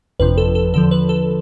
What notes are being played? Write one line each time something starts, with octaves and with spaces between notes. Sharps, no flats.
G1 F2 C3 F3 B4
A4
A4
E2 D3 F3 A4
B4
A4